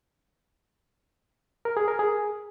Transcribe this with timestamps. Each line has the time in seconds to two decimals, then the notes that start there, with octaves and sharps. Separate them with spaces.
1.65 A#4
1.77 G#4
1.88 A#4
1.99 G#4